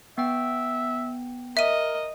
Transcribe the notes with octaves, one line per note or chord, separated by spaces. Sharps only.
B3 E5 G5
A#4 D#5 E5 D#7